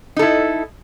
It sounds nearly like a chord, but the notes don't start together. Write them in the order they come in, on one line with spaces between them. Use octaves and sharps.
D#4 A4 E4